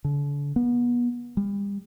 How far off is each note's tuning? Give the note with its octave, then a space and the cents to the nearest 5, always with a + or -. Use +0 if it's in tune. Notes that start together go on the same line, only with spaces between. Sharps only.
D3 -40
B3 -30
G3 +40